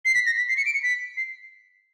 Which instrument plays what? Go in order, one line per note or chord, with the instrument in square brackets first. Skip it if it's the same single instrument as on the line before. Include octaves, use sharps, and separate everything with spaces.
[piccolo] C7
B6
A#6
B6
C7
C#7
D7
C#7
B6
C7